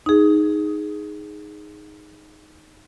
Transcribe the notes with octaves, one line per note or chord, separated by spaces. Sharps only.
D#4 G#4